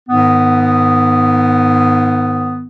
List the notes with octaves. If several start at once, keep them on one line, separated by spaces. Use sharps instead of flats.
G#2 D#3 B3